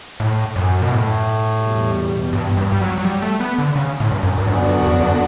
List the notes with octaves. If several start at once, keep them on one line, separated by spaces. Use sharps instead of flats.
A2
F#2
B2
A2
E2 B2 G3
G2
G2
G3
F#3
F#3
G3
A3
B3
D3
C#3
A2
G2
F#2
G2
F#2 D3 F#3 B3 D4 F#4
F#2
E2
F#2